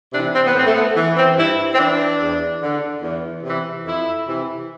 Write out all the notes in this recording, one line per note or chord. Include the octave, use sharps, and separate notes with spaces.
C3 E3 D4
C4
B3
A2 C4
A3
B3
E3
C4
G2 E4
C4
E3 D4
E2
D3
E2
C3 E3
F2 E4
C3 E3